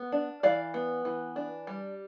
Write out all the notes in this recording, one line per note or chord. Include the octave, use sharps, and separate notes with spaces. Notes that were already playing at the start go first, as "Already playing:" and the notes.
Already playing: B3
D4
E3 D5 F5
B3
E3
D4
G3